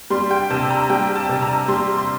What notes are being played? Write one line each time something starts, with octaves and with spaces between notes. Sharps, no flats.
G3 C6
G5
C3 A5
A#5
G3 G5
A5
C3
A#5
G3 C6
C6